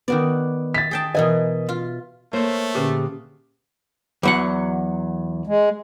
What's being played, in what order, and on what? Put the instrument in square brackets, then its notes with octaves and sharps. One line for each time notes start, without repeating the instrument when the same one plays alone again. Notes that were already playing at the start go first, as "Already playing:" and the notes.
[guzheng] D#3 F#4 D5 [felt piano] B3
[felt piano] A6 B6
[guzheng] G#4 G5 A5
[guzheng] B2 E3 G#5 [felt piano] A#4 D#5
[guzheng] F4
[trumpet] A3 [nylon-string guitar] A#3 C5 [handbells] C#5
[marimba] A#2 D3 C#4 [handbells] G4 G#4 B4
[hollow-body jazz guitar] E2 F#3 F#5
[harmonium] G#3